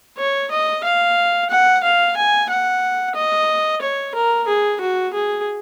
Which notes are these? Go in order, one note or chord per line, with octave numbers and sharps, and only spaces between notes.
C#5
D#5
F5
F#5
F5
G#5
F#5
D#5
C#5
A#4
G#4
F#4
G#4